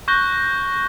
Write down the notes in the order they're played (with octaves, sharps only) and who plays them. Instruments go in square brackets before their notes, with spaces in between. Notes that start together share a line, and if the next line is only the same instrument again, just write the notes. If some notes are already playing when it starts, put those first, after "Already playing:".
[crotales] C#6 F#6 G6 A#6 G7